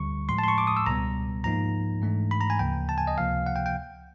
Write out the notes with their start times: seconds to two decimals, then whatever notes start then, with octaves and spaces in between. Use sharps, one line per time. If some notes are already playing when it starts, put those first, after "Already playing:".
Already playing: D2 D3 G3 C#6
0.29 A2 F3 G#3 C6
0.39 A5
0.44 C6
0.48 C#6
0.58 D6
0.67 D#6
0.77 E6
0.86 C#2 B2 G3 B3 A#5
1.44 G#2 F3 A#3 D#4 A#5
2.02 G#2 E3 A3 D4
2.31 B5
2.41 A#5
2.50 G#5
2.59 D2 C#3 F3 A#3 G5
2.89 A5
2.98 G#5
3.07 D#5
3.17 C#2 C3 F3 A#3 F5
3.46 F#5
3.56 G5
3.66 G5